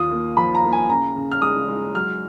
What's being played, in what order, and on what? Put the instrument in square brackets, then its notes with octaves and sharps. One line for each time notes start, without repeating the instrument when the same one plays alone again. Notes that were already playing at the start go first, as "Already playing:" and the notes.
Already playing: [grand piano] D#2 F4 [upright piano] D#6
[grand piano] A#3
[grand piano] F3 [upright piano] B5
[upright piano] A#5
[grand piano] A#3
[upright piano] G#5
[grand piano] C#3 [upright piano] A#5
[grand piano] C#3
[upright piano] F6
[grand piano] G#3 [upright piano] D#6
[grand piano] G#3
[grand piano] F#3 [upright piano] F6